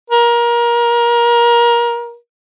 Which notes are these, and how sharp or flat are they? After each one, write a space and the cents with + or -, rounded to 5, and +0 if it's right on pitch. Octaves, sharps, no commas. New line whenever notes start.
A#4 +25